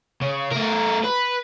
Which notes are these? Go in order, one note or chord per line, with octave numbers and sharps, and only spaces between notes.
C#3
A3 A#4
B4